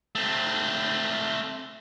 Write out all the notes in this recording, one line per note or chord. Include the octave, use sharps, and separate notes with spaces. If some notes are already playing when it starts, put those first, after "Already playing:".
A3 C4